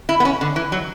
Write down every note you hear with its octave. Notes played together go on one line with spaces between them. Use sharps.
E4
B3
C#4
D3
E3
F#3